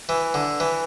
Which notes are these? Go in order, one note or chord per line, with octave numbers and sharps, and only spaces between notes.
E3
D3
E3